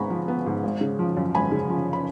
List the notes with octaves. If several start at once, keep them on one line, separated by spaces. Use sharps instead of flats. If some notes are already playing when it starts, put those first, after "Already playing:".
Already playing: G#1 G#2 B3 G#5 A#5 B5 C#6
F3
B3
G#2
G#1
C#3
F3
F#2
G#1 G#5 B5
C#3
F3
B5